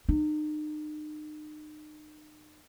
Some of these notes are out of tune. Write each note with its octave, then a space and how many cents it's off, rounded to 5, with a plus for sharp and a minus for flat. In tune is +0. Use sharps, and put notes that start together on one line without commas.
D#4 -40